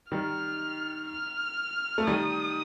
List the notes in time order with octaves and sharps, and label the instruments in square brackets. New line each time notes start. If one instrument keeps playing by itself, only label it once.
[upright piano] D#3 G3 [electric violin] F6
[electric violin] F6
[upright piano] A3
[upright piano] D#3 G3 [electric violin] D#6